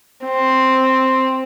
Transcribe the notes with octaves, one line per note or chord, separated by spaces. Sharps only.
C4